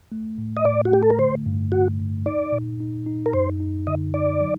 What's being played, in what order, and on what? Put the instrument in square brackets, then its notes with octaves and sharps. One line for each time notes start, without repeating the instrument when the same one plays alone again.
[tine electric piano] A3
A2
[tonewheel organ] D#5
[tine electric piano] A2 [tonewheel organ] D5
[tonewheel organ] F#4
[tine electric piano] A3 [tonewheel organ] G4
[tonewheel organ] A4
A#4
[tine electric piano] D3 [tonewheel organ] C5
[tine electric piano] G2
[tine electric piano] G2 [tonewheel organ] F#4
[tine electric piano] G2
[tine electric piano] D#4 [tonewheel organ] D5
[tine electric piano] A#2
D#4
D#4
[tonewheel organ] A#4
[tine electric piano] F#2 [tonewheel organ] C5
[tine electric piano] D#4
[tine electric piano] D3 [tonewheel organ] D#5
[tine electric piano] D#4 [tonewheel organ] D5
[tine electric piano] F#3